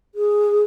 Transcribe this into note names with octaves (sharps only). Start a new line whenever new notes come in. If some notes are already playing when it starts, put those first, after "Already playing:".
G#4